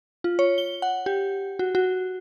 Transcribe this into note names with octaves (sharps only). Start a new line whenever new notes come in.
F4
C#5
G7
F#5
G4
F#4
F#4